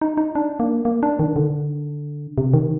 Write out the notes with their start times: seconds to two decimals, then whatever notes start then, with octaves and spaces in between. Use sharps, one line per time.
0.01 D#4
0.17 D#4
0.35 D4
0.60 A#3
0.85 A#3
1.03 D4
1.19 D#3
1.36 D3
2.38 C3
2.54 D#3